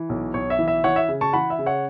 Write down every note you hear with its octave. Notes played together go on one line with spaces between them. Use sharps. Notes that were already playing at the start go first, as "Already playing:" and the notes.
Already playing: E3
B1
B1 C#5
E5
E3
E5
E3 C#5 F#5
E5
C#3
A5 C#6
E3 F#5 B5
E5
C#3
C#5 F#5